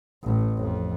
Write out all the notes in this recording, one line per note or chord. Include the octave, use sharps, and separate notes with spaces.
A1 A2
F2